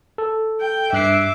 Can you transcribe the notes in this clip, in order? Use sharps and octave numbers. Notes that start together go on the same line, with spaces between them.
A4
G5
G2 E5 D6 F#6 C7